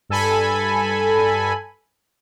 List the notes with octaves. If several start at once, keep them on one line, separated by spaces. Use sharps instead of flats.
G2 A4 G#5 B5